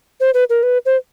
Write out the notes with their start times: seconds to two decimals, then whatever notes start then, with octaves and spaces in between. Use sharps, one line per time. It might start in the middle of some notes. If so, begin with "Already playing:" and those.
0.20 C5
0.34 B4
0.50 A#4
0.63 B4
0.85 C5